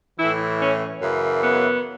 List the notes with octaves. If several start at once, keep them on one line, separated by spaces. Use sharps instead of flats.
A2 E3 E4
C#4
F#2 C#3 E3
B3